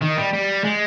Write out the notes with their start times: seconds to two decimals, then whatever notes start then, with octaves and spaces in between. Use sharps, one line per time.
0.02 D#3
0.18 G3
0.34 G3
0.64 G#3